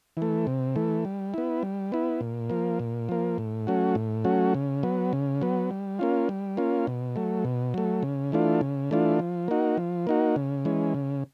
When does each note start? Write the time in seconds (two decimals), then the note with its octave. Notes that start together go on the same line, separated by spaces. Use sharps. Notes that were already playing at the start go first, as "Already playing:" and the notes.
0.17 E3
0.22 A3
0.47 C3
0.76 E3 A3
1.05 G3
1.34 B3 E4
1.63 G3
1.92 B3 E4
2.21 A#2
2.50 F3 A#3
2.79 A#2
3.09 F3 A#3
3.38 A2
3.67 F#3 A3 C#4 F#4
3.95 A2
4.24 F#3 A3 C#4 F#4
4.54 C#3
4.83 F#3 B3
5.13 C#3
5.42 F#3 B3
5.71 G3
5.99 A#3 C#4 F4
6.29 G3
6.57 A#3 C#4 F4
6.87 B2
7.16 F#3 A3
7.45 B2
7.74 F#3 A3
8.03 C#3
8.32 E3 A3 D4 F4
8.61 C#3
8.91 E3 A3 D4 F4
9.19 F3
9.48 A#3 D#4 F#4
9.78 F3
10.07 A#3 D#4 F#4
10.36 C#3
10.65 E3 G#3 C#4
10.94 C#3